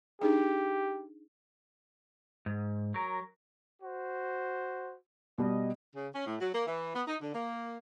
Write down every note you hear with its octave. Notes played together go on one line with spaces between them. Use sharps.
D4 D#4 G4 G#4
G#2
F#3 A#4
F#4 C5
B2 G3 D#5
C#3
C#4
A2
F#3
A#3
E3
B3
D#4
D3
A#3